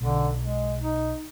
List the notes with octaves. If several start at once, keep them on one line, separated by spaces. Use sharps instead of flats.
B1 D3
G#3
D#4